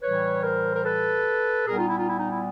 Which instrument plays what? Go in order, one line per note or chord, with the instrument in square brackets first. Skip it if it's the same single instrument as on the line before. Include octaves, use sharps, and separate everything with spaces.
[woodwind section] A2 E3 G3 B4 C#5
A#4 C5
A#4
A4 B4
A#2 G3 B3 G#4 A#4
D#4 F4
E4
D#4 F4
E4
D#4
E4